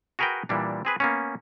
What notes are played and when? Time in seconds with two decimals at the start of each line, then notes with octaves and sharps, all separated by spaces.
0.19 F#4 G#4 A#4 B4 F#5 G5
0.49 A#2 E3 G3 D4
0.85 C4 G#4 B4
1.00 A#3 B3 C#4